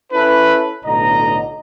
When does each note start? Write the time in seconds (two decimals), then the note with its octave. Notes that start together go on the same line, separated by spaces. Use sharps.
0.12 C#4 E4 A4 B4
0.85 B1 A2 D3 D#5 A#5